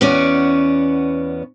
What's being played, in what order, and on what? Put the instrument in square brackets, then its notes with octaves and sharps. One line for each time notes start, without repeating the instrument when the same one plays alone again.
[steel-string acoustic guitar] E2 B3 C#4 F#4 D5